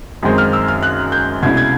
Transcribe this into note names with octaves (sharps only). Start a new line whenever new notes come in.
F#2 D#3 G#3 C4
F6
E6
F6
F#6
G6
C2 B2 G#3 C#4 E4 G#6
G#6